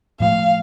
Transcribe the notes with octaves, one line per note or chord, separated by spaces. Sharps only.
A2 F3 A3 F5